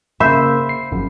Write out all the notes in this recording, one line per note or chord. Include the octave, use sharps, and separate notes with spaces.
C#3 A#3 C5 E5 B5
C7
G1 F#2 F3